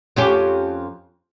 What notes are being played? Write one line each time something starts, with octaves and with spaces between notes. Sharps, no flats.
F2 C#4 G4